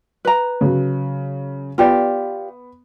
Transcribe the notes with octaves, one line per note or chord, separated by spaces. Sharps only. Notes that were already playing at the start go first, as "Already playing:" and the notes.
B4 A#5
C#3 F#3
B3 F4 G4 D5